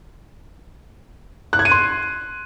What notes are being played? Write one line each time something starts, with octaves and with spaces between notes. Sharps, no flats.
F#6
G#6
D#7
C6